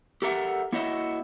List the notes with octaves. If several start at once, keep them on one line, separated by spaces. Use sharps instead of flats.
G4 A4 A#4 E5 F#5
A#3 E4 F#4 C#5 D#5 E5